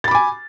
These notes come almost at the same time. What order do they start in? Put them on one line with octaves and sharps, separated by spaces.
A6 B5 D6 G#5